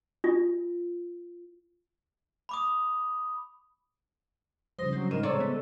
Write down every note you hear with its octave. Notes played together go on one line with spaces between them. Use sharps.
F4
B5 D6 D#6
C#3 F3 G3 C5 D#6 A#6
F#3 C4
G#2 A#4 D#7 E7
C3 G#3 A4 C#5 D5
B3